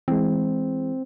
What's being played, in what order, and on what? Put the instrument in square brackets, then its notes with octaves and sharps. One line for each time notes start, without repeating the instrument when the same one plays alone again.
[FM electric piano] E3 G#3 [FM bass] C4